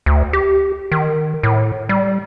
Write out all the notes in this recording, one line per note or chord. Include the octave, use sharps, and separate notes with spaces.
D2
G4
D#3
A2
G3